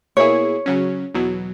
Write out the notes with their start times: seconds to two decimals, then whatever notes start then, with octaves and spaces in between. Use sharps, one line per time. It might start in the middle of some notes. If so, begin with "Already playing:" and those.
0.17 B2 A#3 E4 G#4 C#5
0.66 C#3 F#3 C#4
1.14 E2 B2 F#3